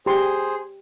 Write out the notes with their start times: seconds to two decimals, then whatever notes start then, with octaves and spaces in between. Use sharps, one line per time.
0.06 G4 G#4 C5 C6